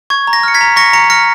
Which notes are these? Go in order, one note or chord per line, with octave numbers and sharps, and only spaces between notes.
C#6 G#6
A#5
A#6
F6 C#7
G#6 B6
A#5
C#6 A#6 C#7
A#5 A#6 C#7
F6 A#6 C#7